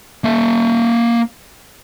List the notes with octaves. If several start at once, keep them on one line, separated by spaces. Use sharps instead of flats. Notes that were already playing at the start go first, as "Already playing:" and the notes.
A#3 E5